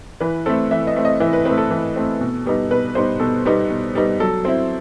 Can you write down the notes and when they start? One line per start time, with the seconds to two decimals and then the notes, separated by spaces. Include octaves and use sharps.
0.20 E3 B4
0.46 A3 C4 A4
0.71 E3 E5
0.87 D#5
0.96 A3 C4
1.05 D#5
1.20 E3 E5
1.33 B4
1.45 A3 C4 B4
1.58 A4
1.71 E3
1.96 A3 C4
2.21 B2
2.46 G3 B3 D#4
2.70 B2 B4
2.95 G3 B3 D#4 C5
3.20 B2 A4
3.45 G3 B3 D#4
3.70 B2
3.95 G3 B3 D#4
4.20 F#3 A4
4.45 C4 E4 C5